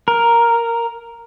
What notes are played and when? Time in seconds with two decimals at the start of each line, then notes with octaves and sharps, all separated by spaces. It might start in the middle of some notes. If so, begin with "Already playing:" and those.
0.08 A#4